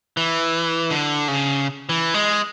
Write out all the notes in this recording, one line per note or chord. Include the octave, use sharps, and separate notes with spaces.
E3
D3
C#3
E3
G#3